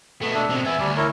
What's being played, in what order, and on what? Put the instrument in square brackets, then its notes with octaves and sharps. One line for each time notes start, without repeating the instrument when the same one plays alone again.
[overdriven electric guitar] B2 A3 [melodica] B3
[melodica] D4 E5
[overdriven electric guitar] B2 C4
[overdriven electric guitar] B3 E4 [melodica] E5 G#5
[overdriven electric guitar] D2 [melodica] G3 D5 G#5
[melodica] E4 A#4 C#5